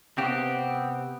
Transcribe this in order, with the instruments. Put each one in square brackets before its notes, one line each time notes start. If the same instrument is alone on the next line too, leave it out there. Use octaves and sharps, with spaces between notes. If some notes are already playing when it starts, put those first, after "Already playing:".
[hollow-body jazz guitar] C3 [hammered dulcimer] B3 F#5 C#6 [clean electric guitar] C4 G4